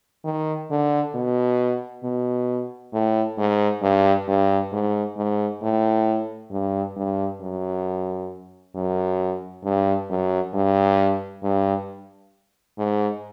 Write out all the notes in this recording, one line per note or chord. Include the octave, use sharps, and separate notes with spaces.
D#3
D3
B2
B2
A2
G#2
G2
G2
G#2
G#2
A2
G2
G2
F#2
F#2
G2
F#2
G2
G2
G#2